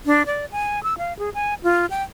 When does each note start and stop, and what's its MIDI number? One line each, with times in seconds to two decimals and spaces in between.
0.06 0.26 62
0.26 0.46 74
0.52 0.83 80
0.83 0.97 88
0.98 1.13 77
1.19 1.30 68
1.34 1.54 80
1.63 1.86 65
1.90 2.03 79